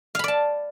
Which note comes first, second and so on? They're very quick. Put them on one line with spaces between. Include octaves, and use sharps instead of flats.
F5 B5 D5 A5